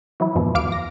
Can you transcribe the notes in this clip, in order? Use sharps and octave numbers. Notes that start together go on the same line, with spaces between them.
E3 F#3 E4
F2 G#2 B2 E3 F3
D#2 F5 D6 F6 D7
A#6